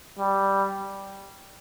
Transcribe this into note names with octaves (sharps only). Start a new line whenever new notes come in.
G3